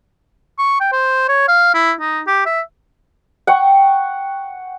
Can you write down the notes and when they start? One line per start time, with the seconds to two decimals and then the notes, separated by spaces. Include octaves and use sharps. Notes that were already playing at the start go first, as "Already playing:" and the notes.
0.59 C#6
0.80 G5
0.92 C5
1.28 C#5
1.48 F5
1.74 E4
2.00 D#4
2.27 G4
2.46 E5
3.47 F#5 G5 C#6